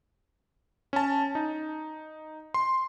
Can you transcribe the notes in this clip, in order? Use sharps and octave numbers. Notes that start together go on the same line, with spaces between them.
C#4 A5
D#4
C6